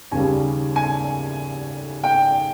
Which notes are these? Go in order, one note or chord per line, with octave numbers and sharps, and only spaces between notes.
D#2 C#3 G3 G#5
G#5
G5